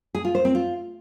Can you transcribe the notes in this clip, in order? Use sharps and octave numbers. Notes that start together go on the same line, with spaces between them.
G#4
F4
C5
C4
F4